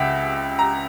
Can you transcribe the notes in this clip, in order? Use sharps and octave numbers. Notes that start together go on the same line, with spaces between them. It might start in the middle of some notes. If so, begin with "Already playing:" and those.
Already playing: C#2 C#3 E5 F#5 G5
A#5